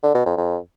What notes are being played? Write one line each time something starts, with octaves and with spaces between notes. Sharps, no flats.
D3
B2
F2
F2